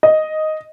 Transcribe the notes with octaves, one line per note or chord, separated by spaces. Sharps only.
D#5